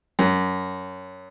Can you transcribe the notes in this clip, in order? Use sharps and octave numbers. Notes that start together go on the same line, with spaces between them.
F#2